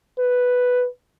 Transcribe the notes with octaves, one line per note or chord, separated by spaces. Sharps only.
B4